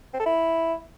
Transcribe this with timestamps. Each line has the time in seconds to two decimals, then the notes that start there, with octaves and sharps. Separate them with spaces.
0.13 C4
0.20 A4
0.26 E4